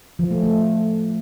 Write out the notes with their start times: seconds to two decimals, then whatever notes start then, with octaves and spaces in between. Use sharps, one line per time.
0.19 F3
0.31 A3
0.42 A3